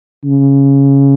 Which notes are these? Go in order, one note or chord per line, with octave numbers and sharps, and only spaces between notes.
C#3